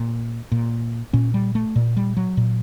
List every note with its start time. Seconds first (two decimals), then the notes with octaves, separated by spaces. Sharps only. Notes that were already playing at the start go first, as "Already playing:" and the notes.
Already playing: A#2
0.52 A#2
1.13 A#2 C#4
1.34 G3
1.55 A3
1.76 A#2
1.97 G3
2.17 F#3
2.37 A#2